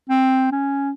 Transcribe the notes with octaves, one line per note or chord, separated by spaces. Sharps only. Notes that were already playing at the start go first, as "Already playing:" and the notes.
C4
C#4